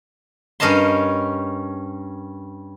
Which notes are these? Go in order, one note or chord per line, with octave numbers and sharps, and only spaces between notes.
G2 C#4 A#4 D#5 A5 C6